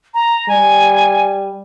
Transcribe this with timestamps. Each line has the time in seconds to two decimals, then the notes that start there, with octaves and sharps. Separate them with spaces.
0.14 A#5
0.49 G3 G#5